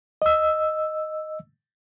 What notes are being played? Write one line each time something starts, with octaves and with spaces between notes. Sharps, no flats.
D#5 E6